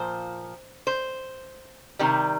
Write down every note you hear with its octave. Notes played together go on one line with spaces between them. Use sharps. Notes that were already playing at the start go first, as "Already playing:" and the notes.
Already playing: A#2 F3 C5
C5
C3 D#3 G3